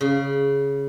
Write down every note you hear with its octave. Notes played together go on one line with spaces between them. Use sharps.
C#3